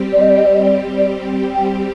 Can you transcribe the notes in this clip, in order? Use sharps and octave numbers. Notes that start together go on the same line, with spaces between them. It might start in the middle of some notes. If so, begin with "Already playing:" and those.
Already playing: G3 C4 G4
D5
D#5
D5
D#5
D5
D#5
D5
D5
G5